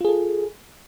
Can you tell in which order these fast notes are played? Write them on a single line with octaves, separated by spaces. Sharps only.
F4 G#4 A4